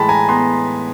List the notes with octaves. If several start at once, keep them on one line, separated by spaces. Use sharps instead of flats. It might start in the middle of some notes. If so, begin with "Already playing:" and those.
Already playing: A2 E3 G#3 G5 A5 B5 C6
G#5 A#5
B3 A#5 C6